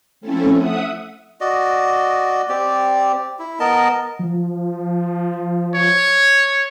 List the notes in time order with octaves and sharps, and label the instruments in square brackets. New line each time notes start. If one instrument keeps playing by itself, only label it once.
[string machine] F3 A3 C4 C#4 E4 A4
E5 F#5 D#6
[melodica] F#4 D5 D#5
C4 G4 D5
E4
B3 A#4 D#5 A5
[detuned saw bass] F3
[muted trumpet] C#5